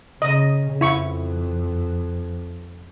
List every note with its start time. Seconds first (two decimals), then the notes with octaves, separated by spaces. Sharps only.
0.22 C#3 D#5
0.81 F2 E4 C#6